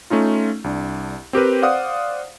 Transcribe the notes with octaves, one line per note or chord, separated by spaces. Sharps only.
A3 C#4 D#4 F4
C2 D4
C4 G4 A#4 B4
C5 D5 F5 F#5 D#6